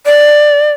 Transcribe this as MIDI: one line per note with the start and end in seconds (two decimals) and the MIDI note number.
0.06 0.72 74